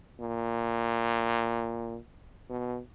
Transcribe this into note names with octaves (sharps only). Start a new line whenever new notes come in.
A#2
B2